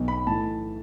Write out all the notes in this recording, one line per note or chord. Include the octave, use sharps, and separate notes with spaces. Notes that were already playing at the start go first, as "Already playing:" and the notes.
Already playing: B1 B2
B5
A2 E3 A5